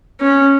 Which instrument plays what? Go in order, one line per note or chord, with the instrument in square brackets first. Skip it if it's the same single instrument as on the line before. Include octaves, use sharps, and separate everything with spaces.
[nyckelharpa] C#4